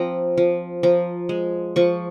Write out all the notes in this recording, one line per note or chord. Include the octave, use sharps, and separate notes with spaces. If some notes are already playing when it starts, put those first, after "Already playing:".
Already playing: F3 C4 A#5
F3
F3 A#5
G#3
F3 C#6